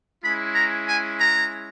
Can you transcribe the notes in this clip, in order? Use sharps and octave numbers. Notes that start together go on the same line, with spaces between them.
G#3 C#4 E4 B5
A#5
G#5
A#5